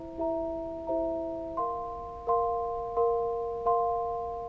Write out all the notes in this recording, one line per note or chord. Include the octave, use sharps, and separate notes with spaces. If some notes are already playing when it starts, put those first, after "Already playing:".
Already playing: E4 C5 E5 A#5
E4 G4 C5 E5 A#5
E4 G4 C5 E5 A#5
A#4 F5 C6
A#4 F5 C6
A#4 F5 C6
A#4 F5 C6